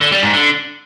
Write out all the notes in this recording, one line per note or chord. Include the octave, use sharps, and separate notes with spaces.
D3
G3
G#2
D3